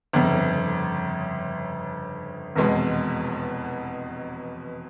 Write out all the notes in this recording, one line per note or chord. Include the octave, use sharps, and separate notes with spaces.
G1 F2 C#3
F1 E2 B2 G#3 B3